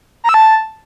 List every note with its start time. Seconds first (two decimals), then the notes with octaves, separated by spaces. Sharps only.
0.24 A#5
0.29 E6
0.34 A5